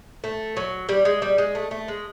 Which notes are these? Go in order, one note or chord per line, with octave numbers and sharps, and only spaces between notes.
A3
F#3
G3
G#3
G3
G#3
A3
A3
G#3